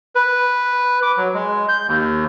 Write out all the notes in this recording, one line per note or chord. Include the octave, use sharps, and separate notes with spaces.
B4
D6
F#3
G#3
G6
D#2